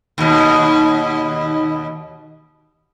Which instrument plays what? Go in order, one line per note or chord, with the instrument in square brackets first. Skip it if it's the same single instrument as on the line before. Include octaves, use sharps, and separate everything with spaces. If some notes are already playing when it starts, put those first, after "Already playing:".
[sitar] D#2 B2